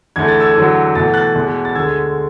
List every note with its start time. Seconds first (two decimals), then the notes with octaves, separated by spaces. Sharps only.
0.16 E2 D3 A3 G#6
0.28 A6
0.40 E6 G#6
0.55 E2 D3 F#3
0.95 E2 B2 A3 A6
1.14 F#6 A6
1.36 E2 B2 G#3
1.65 A6
1.75 D2 D3 G#3 E6 G#6